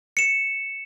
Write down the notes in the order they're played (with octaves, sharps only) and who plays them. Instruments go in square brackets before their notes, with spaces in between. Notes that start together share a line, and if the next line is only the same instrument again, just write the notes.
[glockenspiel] C#7 E7